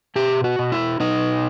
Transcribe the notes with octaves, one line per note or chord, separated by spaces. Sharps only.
B2 G4
F#4
B2
E4
B2 D#4